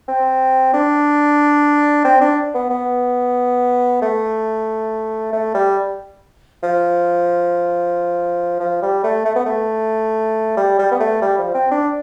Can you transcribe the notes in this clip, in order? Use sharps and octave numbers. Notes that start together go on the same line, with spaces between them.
C4
D4
C4
D4
B3
B3
A3
A3
G3
F3
F3
G3
A3
A3
B3
A3
G3
G3
B3
A3
G3
F3
C4
D4